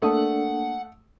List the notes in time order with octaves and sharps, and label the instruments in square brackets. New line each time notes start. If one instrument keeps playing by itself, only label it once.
[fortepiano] A3 D#6 [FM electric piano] A#3 D4 A4 [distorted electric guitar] F#5